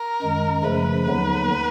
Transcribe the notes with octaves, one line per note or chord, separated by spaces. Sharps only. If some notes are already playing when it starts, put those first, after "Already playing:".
Already playing: A#4
F#2 D#3 G#3
F#2 C#3 F3 A3 B4
D#2 D3 F#3 B3 D#4